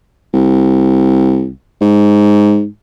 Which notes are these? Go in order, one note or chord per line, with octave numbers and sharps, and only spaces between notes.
C2
G#2